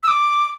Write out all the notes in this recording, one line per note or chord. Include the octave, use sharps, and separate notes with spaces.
E6
D6